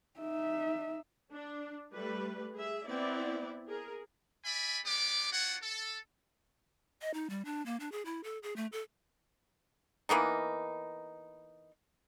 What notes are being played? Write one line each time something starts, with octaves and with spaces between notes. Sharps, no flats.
D#4 E5
D4
G3 A3 B4
G#4 E5
B3 C4 E4 D5
G#4 A#4
D5 E5 G#5 B5
G#3 B3 G4 D5 D6
D4 F4 F#4 C#5 F#5
A4
D#5
D#4
G3
D4
A#3
D4
G#4
E4
A4
G#4
A3
A4
E3 A#3 B3 D#4